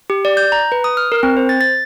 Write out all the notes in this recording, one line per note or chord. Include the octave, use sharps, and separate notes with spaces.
G4
D5
G6
A#5
B4
D#6
F6
A#4
C4
C5
A6
A6